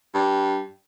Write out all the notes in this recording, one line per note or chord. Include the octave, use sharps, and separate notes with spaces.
G2